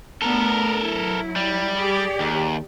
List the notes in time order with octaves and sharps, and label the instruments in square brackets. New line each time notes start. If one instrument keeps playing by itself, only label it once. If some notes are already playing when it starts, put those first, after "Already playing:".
[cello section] A3 B3 D4 [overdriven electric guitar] A4 A#4
[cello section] F#3 E4
[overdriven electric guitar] G3
[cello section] G4 G#4 D5
[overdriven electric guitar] D#2